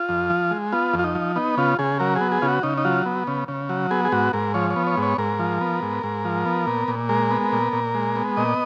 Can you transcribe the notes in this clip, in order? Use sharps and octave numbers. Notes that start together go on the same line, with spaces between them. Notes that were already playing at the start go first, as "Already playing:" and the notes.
Already playing: F4
F2
F3
G#3
B3 F4
F2
F4
D#4
F3
B3 D#4
C#3 F4
C#3 G#4
F#3 A#4
G#4
B3
G#4
C#3 F4
F#4
C#3 D#4
D#4
F#3 F4
B3
C#3
C#3
F#3
B3 G#4
G#4
G#2 F#4
G#2 A#4
F3 C#5
C#5
B3
C#5
G#2
C#5
G#2 A#4
F3
B3
G#2
G#2
F3
B3
A#2
A#2
G#3 A#4
B3
A#2
A#2
G#3
B3
A#2 D#5